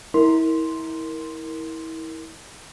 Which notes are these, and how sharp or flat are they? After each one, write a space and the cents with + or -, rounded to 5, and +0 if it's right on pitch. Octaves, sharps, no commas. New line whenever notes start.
E4 -30 A#4 +0 C6 +0